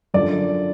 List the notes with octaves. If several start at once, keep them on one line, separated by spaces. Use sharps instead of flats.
F#2 D3 F3 D5